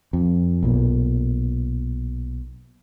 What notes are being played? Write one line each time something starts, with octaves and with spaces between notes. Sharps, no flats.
F2
B1 A#2